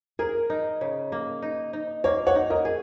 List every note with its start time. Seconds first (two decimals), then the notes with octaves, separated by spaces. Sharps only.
0.19 G#4 A#4
0.50 D#4
0.81 C#3
1.12 A#3
1.42 D#4
1.73 D#4
2.04 A#3 C#5
2.26 C#5 F#5
2.35 D#4
2.50 A#4 D#5
2.65 G#4